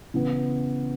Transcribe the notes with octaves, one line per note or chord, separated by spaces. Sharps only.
C#3 E3 B3